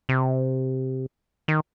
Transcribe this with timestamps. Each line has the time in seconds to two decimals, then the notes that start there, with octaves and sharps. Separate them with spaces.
0.09 C3
1.48 D#3